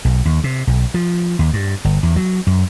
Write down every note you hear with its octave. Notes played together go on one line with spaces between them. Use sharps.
B1
D#2
C3
B1
F3
D#2
G2
G1
E2
F#3
F#2